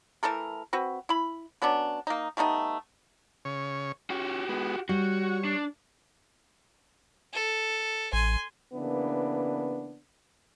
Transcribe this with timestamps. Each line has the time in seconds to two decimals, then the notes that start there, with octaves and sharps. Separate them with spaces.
0.23 E3 A3 A4 A#4
0.73 C4 F#4 B4
1.09 E4 B5
1.62 F#3 B3 C#4 D4
2.07 A#3 D#4
2.37 G3 A3 B3 D#4
3.45 C#3 C#5
4.10 C#4 F#4 G4
4.49 G#3 B3
4.89 G3 F#4 C#5
5.44 D4
7.34 A4
8.13 A1 G#5 C6
8.74 C#3 E3 A#3 B3 D4